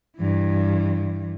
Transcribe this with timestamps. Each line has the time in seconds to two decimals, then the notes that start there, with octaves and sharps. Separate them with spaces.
0.17 G2 E3